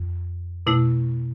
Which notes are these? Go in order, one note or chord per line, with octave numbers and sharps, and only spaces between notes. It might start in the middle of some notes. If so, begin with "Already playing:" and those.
Already playing: F2
B2 A3 E4